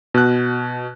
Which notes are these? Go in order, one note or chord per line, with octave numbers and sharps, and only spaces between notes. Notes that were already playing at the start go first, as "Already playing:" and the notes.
B2 F#6